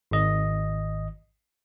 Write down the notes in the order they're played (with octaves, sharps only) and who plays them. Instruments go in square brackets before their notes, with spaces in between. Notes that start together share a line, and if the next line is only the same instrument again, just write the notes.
[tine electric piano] G#1 D#5